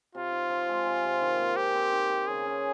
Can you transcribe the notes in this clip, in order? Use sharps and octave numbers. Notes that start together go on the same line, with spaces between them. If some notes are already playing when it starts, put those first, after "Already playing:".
C3 F4
D#4
F3
G#3
C3
C3
D#3
A#3
C4 G4
C4
D#4
A#4
C#3 G#4
C#4